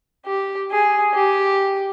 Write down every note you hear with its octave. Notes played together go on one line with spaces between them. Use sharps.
G4
G#4
G4